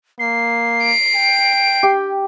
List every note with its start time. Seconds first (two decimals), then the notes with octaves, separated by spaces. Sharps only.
0.19 A#3 C7
0.84 D7
1.15 G5
1.83 G4